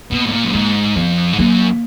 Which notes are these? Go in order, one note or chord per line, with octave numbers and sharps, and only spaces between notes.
B2 A#3
G#2
A#2
F#2
G#2 A#3
F2 B3
G#2
F#2 A#3